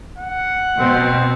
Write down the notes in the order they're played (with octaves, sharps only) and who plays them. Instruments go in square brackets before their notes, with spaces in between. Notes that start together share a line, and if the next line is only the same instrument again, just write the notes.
[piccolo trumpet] F#5
[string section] B2 [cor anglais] C4